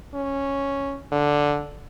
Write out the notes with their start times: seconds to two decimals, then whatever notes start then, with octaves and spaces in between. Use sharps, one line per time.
0.14 C#4
1.12 D3